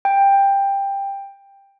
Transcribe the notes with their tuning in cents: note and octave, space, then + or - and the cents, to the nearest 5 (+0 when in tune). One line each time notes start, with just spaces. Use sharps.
G5 +15